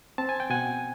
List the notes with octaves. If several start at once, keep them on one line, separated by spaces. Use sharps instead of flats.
C4 A5
G#5
G5
B2 F#5 G#5